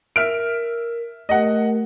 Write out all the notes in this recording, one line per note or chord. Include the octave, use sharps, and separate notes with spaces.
A#4 E5 F6 D7
A3 G4 A#4 D#5 F#5